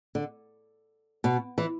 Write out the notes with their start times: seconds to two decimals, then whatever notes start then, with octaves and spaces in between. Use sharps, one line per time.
0.15 D3
1.24 B2
1.58 E3